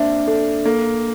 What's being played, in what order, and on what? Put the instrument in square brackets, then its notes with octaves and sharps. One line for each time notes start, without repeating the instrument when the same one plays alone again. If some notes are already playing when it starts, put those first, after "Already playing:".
Already playing: [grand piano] A#3 C4 D4 [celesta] E5
[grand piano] D4 [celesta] A4
[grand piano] A#3 [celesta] A4